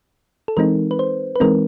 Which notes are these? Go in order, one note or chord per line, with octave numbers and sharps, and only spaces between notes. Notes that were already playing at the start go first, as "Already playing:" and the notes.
A4
E3 G#3 C4 D#4 A#4
B4
C5
B4
E3 G#3 C4 D#4 A#4